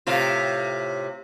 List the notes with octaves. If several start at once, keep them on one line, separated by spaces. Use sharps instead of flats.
A2 C3 F4